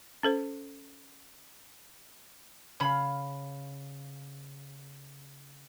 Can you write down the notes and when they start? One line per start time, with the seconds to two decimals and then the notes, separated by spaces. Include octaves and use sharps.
0.23 C#4 A4 C5
2.80 C#3 C#4 F5 B5